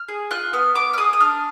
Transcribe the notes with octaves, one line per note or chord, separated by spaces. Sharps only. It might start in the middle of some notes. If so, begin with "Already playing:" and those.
Already playing: F6
G#4
F4 F#6
B3 F6
B3 D6
F6
G#4 D#6
D#6
D4 F6